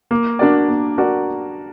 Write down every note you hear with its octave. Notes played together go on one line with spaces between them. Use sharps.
A#3
D4 F#4 A#4 D5
A#3
D4 F#4 A#4 D5